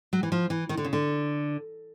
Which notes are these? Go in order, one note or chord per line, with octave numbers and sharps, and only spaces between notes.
F#3
E3
F3
E3
D#3
D3
C#3
D3